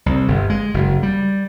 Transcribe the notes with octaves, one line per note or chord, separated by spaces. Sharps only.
C2
G1
G#3
F#1
G3